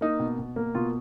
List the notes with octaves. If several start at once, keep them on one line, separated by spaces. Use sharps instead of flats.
A#3 D#4
B2
B2
A#3
B2 F4